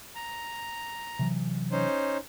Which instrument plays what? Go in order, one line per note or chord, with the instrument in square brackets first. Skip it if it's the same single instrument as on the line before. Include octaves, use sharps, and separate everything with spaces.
[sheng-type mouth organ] A#5
[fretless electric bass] C3 E3 F#3
[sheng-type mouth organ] C#4 D#4 C5